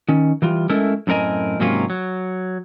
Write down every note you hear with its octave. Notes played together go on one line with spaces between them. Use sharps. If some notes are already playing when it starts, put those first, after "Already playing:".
D#3 C#4
E3 G3 F4
G#3 A3 C#4 E4 A4 A#4
F#2 A2 C4 A#4 D#5 G#5
G#2 C3 F#3 A#3 C#4 F4
F#3